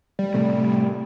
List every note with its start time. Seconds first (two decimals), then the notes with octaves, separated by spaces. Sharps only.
0.19 G3
0.34 A2 C3 A3